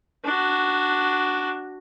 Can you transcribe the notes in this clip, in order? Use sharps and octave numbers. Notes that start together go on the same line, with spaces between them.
D4 F#4